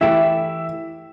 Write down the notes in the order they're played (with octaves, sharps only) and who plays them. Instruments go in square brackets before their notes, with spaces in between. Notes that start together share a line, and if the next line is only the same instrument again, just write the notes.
[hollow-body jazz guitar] E3 A3 E4 G4 [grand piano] E5